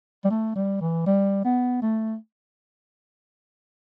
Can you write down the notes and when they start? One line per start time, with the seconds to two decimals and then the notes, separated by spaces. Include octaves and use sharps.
0.24 G3
0.31 A3
0.56 G3
0.81 E3
1.06 G3
1.45 B3
1.82 A3